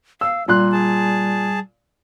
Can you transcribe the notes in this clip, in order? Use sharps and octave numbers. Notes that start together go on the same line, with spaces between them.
F5 E6
A#2 G3 C6 F#6
G#4 A5